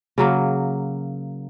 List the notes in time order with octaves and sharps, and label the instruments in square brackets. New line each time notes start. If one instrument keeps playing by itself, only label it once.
[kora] C#3 F#3 A#3